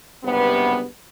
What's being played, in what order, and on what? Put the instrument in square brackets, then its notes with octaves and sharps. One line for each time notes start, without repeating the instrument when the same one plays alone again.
[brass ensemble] F#1 G2 C3 B3